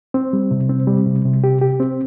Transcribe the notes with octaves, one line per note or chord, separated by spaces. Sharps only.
C4
G3
C3
C4
G3
C3
C3
G4
G4
C4